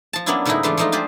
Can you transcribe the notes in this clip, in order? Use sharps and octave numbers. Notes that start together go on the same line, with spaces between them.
F3 A5
F#3 A#3 B3 C#4 D4 E4
G#2 C#3 F#3 A3 D#4 E4
E3 G#3 A3 D4 F4
F3 G#3 A3 D#4 F4
D4 F4 G4 G#4 C5